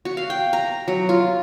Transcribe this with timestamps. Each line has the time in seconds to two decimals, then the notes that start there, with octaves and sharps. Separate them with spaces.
0.05 F#4
0.17 F5
0.30 G5
0.53 A#5
0.88 F#3
1.09 F4